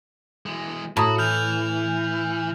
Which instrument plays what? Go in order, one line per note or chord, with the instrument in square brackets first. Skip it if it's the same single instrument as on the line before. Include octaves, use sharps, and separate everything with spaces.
[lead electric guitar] E3 G#3
[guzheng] A2 [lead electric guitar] F#4 [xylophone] A5 A#5 D#6
[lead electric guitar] E3 [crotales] F6 G6 F7